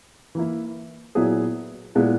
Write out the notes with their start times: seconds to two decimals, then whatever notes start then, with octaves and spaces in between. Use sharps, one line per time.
0.35 E3 A#3 E4
1.15 A#2 F#3 B3 E4 G#4
1.95 A#2 G#3 B3 E4